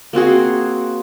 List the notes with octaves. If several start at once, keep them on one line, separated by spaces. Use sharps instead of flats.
A#3 C4 F#4 G#4